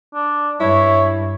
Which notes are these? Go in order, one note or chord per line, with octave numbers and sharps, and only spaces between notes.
D4
G2 E4 C#5